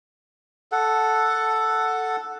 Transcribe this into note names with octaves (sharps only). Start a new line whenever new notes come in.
A4 F#5